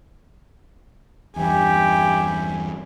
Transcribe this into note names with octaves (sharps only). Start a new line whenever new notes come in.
E2 G2 E4 G4 G#5